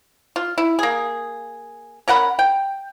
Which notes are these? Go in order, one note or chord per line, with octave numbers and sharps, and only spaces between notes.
F4
E4
A#3 G#4
C#4 A#4 F#5 B5
G5